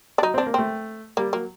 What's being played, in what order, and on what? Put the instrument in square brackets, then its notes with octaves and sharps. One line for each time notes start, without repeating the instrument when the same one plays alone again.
[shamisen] D4
[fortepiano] F#3 [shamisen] D#4
[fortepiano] C4
[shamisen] D4
[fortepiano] A#3
[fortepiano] A3 [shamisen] C4
[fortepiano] G3 [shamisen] A#3
[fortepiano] F#3 [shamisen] A#3